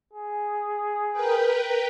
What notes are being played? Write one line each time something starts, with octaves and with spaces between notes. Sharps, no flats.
G#4
A#4 B4 G5